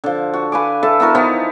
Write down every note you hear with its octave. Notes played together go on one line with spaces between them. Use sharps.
D3 F3
F#4
B4 F5 G#5 D6
A4 B4 E5 A5
B3 E4 F#4 A#4
E3 F3 B3 D#4